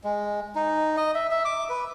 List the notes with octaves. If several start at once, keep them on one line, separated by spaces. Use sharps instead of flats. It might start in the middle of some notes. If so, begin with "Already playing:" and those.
G#3
D#4
D#5
E5
E5
D6
B4